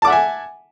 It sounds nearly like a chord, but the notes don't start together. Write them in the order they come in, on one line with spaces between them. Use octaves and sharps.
A5 D6 F#5 E5 G#5